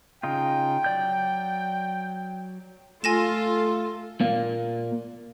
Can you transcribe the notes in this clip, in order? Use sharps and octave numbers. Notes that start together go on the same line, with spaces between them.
C#3 D#4 F4 G5
F#3 D5 G6
A3 F4 A4 G#5 A#6 E7
A#2 A#3